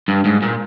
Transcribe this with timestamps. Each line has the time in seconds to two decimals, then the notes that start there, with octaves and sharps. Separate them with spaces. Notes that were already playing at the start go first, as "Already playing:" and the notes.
0.08 G2
0.25 G#2
0.42 A#2